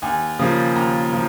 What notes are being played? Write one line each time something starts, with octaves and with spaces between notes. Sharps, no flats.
D#2 G#5
C#3 F3 A#3
D#2 A#5
F3 A#3